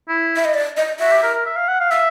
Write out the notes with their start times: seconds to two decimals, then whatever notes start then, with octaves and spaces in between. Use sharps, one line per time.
0.08 E4
0.36 E5
0.45 D#5
0.54 D5
0.77 D#5
1.00 F#4 E5
1.11 G4
1.23 A#4
1.35 A#4
1.46 E5
1.56 F5
1.68 F#5
1.80 F5
1.91 E5 F5